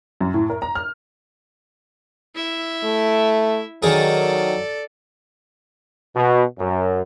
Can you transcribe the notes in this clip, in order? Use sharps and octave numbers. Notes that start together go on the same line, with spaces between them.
F#2
A2
A#4
A#5
F6
E4 E5
A3
D#3 F#3 G#4 A4 D5
B2
F#2